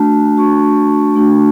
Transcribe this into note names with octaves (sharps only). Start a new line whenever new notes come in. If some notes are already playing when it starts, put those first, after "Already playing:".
Already playing: A3 D4 F#4 A5
A3 D4 F#4 C#6
A3 D4 F#4